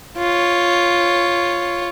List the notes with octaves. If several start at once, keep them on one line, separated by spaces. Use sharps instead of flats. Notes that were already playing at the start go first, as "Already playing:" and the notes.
F4 C#5